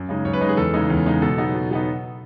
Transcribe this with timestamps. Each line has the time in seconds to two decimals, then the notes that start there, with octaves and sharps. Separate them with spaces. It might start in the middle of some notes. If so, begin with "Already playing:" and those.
Already playing: F#2
0.09 C#3 G#3 D#4
0.25 F#2 C#5
0.33 B4
0.41 C#3 G#3 D#4
0.49 G#4
0.57 E2 A4
0.74 C#3 G#3 D#4
0.90 E2
1.06 C#3 G#3 D#4
1.22 B2 A4
1.38 F#3 B3 D#4
1.55 B2
1.70 F#3 B3 D#4